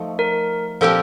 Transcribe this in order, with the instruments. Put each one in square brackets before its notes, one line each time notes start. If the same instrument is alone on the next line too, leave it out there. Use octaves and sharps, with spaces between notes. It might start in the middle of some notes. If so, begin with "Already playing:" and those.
Already playing: [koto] F3 A3 D#4
[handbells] A#4
[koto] A#2 F3 C4 G4 A#4 [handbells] A4